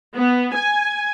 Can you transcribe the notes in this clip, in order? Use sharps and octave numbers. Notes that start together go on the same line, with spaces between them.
B3
G#5